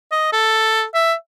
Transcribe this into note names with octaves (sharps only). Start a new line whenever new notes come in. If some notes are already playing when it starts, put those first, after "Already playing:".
D#5
A4
E5